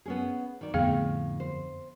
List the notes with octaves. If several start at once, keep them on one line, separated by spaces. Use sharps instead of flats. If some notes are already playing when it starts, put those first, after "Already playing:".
B3 C#4 G#4
D#3 D5
F2 A2 D3 B3 G#4 F5
C5